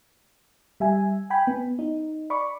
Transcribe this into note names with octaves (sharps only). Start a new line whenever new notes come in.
G3 E5 G#5
G5 G#5 B5
B3
D#4
D5 B5 C#6 D6